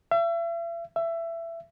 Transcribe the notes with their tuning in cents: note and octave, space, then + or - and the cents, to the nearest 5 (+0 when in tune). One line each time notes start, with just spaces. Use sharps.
E5 +40
E5 +20